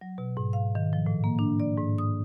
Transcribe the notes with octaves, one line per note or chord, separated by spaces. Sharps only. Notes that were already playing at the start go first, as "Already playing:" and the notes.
F#3
B2
G#2
F5
D#3
F3
A2
A#3
D4
D5
G#2
D#6